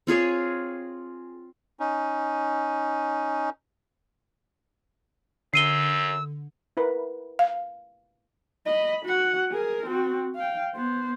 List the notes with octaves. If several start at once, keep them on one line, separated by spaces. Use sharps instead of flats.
C4 F4 G#4 C#5
C#4 D#4
F#2 D3 E6 C7 D#7 G7
E4 A#4 B4
F5
D#5 B5
F#4 F#5
G#4 A#4
C4 F#4
F5 G5
B3 C5